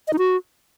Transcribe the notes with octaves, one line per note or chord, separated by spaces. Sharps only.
D#5
D#4
F#4